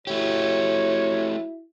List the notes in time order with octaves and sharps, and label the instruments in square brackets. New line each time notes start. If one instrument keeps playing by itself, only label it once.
[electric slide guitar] A3 G4 [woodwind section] E4 F#4 [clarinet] C#5